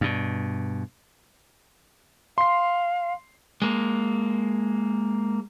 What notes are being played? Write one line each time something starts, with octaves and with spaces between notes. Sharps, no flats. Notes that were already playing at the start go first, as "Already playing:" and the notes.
G2 B2
F5 C6 C7
G#3 A#3